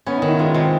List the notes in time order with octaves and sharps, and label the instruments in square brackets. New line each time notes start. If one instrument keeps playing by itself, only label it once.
[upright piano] B3 [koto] C#4
[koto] D#3 [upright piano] D#4
[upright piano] E4
[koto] G#3 [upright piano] F4
[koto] C3